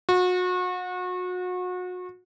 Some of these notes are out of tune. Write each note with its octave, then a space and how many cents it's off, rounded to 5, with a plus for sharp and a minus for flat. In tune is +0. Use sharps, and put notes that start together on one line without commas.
F#4 -35